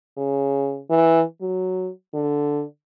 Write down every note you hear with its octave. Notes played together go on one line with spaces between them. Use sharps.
C#3
E3
F#3
D3